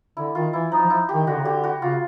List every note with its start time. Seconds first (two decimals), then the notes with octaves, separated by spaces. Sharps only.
0.17 D3 E4
0.35 D#3 F4
0.53 E3 E4
0.72 F3 D#4
0.86 F3 E4
1.09 D#3 G4
1.26 D3 F#4
1.35 C#3
1.43 D3 G4
1.64 F#4
1.82 C#3 F4